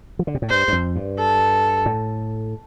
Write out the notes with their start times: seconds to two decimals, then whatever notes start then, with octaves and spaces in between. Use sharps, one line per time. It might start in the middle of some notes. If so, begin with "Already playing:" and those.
0.19 F3
0.27 D3
0.35 C3
0.42 A2
0.49 G2 C5
0.68 G2
0.73 F2
0.96 G2
1.18 A4
1.86 A2